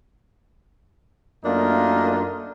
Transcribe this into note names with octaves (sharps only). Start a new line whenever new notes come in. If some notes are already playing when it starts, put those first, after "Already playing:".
F#2 A3 A#3 D4 D#4 F4